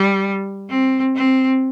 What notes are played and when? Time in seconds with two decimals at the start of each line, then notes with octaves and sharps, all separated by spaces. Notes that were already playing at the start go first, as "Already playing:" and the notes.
Already playing: G3
0.70 C4
1.15 C4